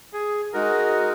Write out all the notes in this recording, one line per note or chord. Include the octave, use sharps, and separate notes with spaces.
G#4
G#3 D#4 F#4 A#4